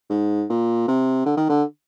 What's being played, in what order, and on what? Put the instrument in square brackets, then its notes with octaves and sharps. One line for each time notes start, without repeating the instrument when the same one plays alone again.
[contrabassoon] G#2
A#2
C3
D3
D#3
D3